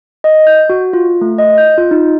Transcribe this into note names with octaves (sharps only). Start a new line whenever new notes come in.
D#5
G6
F#4
F4
A3
D#5
G6
F4
D#4